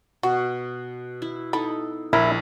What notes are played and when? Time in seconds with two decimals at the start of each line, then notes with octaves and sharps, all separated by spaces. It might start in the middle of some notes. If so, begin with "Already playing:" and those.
0.23 B2 F#4
1.22 E4
1.53 D#4 E4 A4 B5
2.13 A#1 E4 A#4 D#5